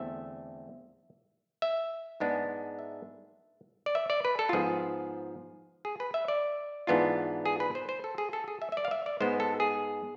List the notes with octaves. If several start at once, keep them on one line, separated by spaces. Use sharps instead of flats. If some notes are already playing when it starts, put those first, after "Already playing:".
Already playing: E2 D3 A3 C4 E5
E5
G#2 G#3 B3 D4
E5
D5
E5
D5
B4
A4
F4
G#2 F3 B3 G#4
G#4
B4
E5
D5
G#2 E3 B3 D4 F4
G#4
B4
C5
C5
A4
G#4
A4
G#4
E5
E5
D5
F5
E5
D5
G#2 G#3 B3 C5
A4
G#4